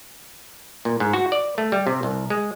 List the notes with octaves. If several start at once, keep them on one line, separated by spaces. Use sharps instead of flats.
A#2
G#2
F#4
D5
A3
G3
C3
C2
G#3